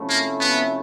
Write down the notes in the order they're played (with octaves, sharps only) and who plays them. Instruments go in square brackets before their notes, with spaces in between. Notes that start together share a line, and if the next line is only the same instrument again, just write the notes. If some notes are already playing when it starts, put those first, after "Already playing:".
Already playing: [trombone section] C3 F3 A3 C#4 E4
[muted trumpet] A#3
B3